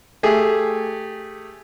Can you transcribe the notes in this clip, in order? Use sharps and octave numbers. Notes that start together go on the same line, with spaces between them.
A3 G4 G#4